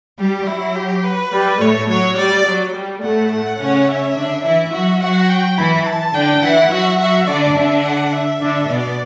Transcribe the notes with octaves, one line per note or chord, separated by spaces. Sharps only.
G3 G4
F#3 E4
G4
B4
G3
A2 A3 C#5
F#3 C#5
G3 D5
F#3
G3
A2 A3 F#5
F#5
C#3 C#4
E5
D3 D4
E3 E4 E5
F#3 F#4
F#3 F#4 F#5
G5
E3 E4 B5
A5
D3 D4 G5
E3 E4 F#5
F#3 F#4 E5
F#3 F#4 E5
D3 D4 D5
D3 D4 E5
F#5
E5
D3 D4
B2 B3 D5